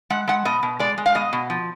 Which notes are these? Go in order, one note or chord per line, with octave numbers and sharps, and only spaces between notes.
G#3 F#5
G#3 F#5
B2 D#5
B2
G#3 D5
G#3
F5
B2 D#5
B2
F3